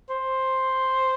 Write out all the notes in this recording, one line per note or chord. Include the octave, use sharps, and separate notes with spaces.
C5